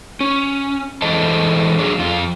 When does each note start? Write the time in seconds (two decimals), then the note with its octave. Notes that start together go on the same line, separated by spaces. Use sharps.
0.20 C#4
1.02 E3 G#3 A4 C5 D#5 A5
1.79 F#3 D4 G#4
1.99 F2 F4